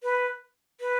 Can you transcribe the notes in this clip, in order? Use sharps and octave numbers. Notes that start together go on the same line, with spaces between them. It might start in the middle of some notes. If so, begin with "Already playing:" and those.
B4
B4